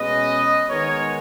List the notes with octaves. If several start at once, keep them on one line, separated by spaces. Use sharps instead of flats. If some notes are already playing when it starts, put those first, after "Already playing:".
Already playing: B2 G#3 C#4 B4 D#5
D#3 G#3 B3 A#4 C#5